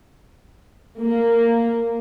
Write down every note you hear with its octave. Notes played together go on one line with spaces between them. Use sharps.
A#3